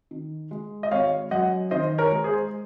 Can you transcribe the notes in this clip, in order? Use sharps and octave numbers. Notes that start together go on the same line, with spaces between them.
D#3
G#3
D#5
G#1 C#5 F5
F#2 D#5 F#5
D#3 C5 D#5
A#4 C#5
G#3
G#4 C5